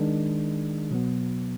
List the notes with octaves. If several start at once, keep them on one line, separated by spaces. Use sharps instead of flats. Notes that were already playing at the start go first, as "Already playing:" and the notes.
Already playing: D#3 G#3 D4
B2 F#3 B3